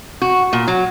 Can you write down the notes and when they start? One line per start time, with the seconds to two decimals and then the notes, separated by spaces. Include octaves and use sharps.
0.22 F#4
0.53 A#2
0.68 F#3